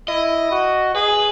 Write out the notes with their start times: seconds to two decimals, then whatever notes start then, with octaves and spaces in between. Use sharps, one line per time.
0.08 E4 D#5
0.51 F#4
0.95 G#4 B4